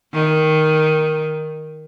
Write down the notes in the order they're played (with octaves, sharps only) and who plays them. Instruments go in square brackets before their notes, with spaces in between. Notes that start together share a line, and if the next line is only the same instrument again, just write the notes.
[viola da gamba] D#3